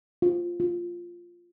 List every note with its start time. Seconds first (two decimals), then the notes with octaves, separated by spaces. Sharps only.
0.22 F4
0.60 F4